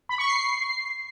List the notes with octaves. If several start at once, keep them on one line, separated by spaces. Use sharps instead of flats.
B5
C#6
C7